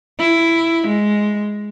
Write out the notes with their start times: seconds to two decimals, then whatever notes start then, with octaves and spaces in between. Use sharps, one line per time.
0.19 E4
0.87 G#3